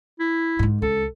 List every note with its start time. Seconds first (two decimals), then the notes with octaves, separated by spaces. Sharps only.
0.20 E4
0.59 G#2 D#3
0.82 C#2 A4